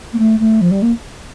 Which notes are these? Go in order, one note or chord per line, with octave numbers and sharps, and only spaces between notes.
A#3
A3
A3
F3
G3
A#3